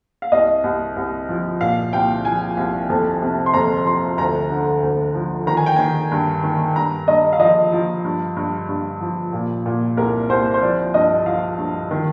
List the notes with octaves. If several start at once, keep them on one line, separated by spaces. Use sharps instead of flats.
F5
C2 D#5
C2
C2
F3
A#2 F5
C2 G5
F3 G#5
C2
F2
C3
C6
F2 A#5
F3 C6
D2 A#5
D3
D2
F3
D#3 A#5
G#5
G5
D#3 G#5
G2
D#3
G2 A#5
G2 D#5
F5
F3 D#5
F3
G2
G2
G2
F3
A#2
A#2
C2 A#4
C2 C5
C5
F3 D5
G2 D#5
F3 F5
G2
D#3